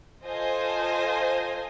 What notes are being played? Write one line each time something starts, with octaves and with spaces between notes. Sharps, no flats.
F4 A4 C5 D#5 G#5